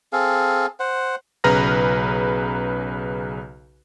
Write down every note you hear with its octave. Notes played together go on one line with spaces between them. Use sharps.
C4 G#4 A4 F5
C5 F#5
B1 C#3 B4 A#5 F6 A#6